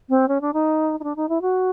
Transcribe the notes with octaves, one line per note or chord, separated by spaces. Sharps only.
C4
C#4
D4
D#4
D#4
D4
D#4
E4
F#4